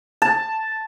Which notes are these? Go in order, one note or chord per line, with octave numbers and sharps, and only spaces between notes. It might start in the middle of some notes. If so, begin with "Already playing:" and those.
A5